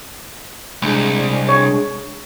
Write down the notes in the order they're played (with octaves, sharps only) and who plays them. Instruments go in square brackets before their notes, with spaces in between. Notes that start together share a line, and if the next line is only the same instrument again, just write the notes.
[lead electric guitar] C2 [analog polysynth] G#3 D4 G#4
[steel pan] C#5